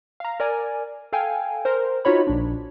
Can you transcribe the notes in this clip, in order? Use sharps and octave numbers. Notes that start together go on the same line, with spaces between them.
F5 A#5
A#4 D5 G#5
A4 F5 G5 G#5
A#4 C5
D#4 F4 F#4 C#5 B5
A#1 D4